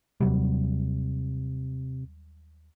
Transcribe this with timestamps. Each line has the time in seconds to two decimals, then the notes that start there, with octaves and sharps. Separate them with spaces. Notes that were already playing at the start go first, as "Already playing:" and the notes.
0.21 D#2 C3 F#3 G3